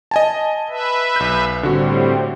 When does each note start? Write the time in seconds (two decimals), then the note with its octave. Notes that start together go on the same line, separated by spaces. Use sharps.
0.11 D#5 G#5 A5
0.69 B4 E5
1.16 B1 G6
1.63 A2 D3 G3 C4 F#4